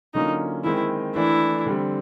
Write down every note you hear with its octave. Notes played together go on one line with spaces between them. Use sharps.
D3 F#3 A#3 C#4 D#4 F4
D#3 G#3 C4 E4
E3 A3 D4 E4
D3 G3 C4